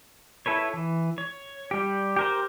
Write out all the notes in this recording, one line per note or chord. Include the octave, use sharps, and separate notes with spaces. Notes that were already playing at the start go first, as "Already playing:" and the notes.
E4 A4 B4 C#5
E3
C#5
G3 G4
G4 A#4 C5